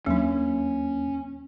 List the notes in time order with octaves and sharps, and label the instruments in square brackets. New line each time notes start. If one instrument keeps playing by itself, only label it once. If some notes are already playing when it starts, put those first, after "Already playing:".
[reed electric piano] D#2 A#3 [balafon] F#3 D4 [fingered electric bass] C#4